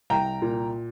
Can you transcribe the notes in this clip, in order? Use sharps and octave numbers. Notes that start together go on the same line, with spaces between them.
C2 G5 A#5
A#2